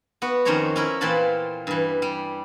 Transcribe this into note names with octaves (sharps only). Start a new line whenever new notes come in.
B3 F#4
F2 D#3 C#4 C5 C#5 A#5
C#4 E4 A#4
A#2 E3 C4 F4 A5 B5
G2 E3
G3